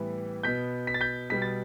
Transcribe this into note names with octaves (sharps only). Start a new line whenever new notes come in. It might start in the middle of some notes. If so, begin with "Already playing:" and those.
Already playing: A2 E3 G3 B3
B2 B3 G6 B6
B6
A6
G6 B6
B2 G3 B3 B6
A6